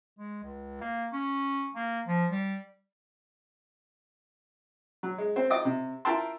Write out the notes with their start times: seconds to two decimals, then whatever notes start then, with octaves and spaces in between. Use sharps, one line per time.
0.19 G#3
0.43 C#2
0.81 A#3
1.13 C#4
1.75 A#3
2.07 F3
2.31 G3
5.03 F#3
5.18 G#3
5.36 C4 C5
5.50 D#4 F4 D#5 G5 D6
5.65 C3
6.05 E4 F4 A#4 G5 A5 C6